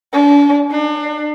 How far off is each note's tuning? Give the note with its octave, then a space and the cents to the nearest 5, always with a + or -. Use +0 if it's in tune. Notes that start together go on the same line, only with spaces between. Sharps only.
D4 -40
D4 +40